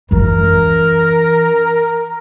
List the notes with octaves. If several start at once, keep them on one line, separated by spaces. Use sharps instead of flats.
F#2 E3 A#4